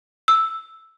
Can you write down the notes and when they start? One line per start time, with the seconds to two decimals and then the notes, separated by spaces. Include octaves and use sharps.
0.28 E6